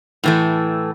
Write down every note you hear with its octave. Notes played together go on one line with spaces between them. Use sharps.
A2 E3 A3